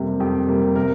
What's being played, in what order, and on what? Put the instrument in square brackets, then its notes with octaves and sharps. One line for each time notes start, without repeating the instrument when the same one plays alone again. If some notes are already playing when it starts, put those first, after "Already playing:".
Already playing: [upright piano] F2 C3 G3 A#3
F2 G4
C3 G3 A#3
C3 A#4